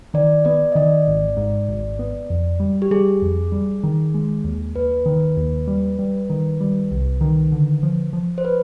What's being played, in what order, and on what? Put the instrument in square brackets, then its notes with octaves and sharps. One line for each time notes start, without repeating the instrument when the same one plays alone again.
[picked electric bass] D#3 [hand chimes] D5
[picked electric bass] B3 [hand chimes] D5
[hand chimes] D#5
[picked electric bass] D#3 [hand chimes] D5
[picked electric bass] G#1
G#2
G#1
B3
F2
G3
[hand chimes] G4
[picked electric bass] G3 [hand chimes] G#4
[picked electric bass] F2
G3
D#3
G#3
D#2
[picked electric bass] D#2 [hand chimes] B4
[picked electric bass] D#3
D#2
G3
G3
D#3
G3
C2
D#3
D3
F3
F3
[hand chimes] C5
B4